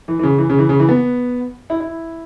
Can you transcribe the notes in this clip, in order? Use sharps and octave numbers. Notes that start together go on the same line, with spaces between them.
E3
E3
C#3
E3
C#3
E3
C#3
E3
B3
E4
E4